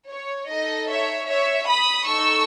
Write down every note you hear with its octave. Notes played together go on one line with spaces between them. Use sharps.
C#5
D#4 A4 D#5
C#5 E5
C#5 E5
B5 D#6
D#4 A4 C#6 E6